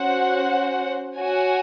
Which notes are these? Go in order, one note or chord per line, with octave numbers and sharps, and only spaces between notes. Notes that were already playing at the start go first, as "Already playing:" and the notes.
Already playing: C#4 F#4 C5 F#5
F#4 C#5 G#5